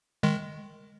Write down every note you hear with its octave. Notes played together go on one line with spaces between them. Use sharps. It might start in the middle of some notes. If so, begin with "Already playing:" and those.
D#3 G#3